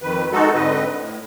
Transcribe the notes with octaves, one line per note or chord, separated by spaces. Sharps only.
F2 D#3 B4
G#3 D#4 F#4 A4
G#2 D3 C4 B4 D#5
A2